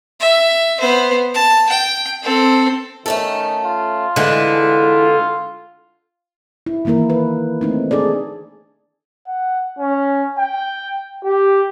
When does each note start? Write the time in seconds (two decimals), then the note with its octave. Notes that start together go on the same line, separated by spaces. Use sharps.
0.20 E5
0.80 B3 C5
1.34 A5
1.69 G5
2.23 C4 A4
3.06 D#3 A3 C#4 A4
3.64 F4
4.16 D3 E3 G#3 D4 E4
6.66 E4
6.85 D#3 E3 A#3 E4 A#4
7.10 B4
7.61 A3 C4 D#4
7.91 D4 G#4 A4 D5
9.28 F#5
9.79 C#4
10.38 G5
11.24 G4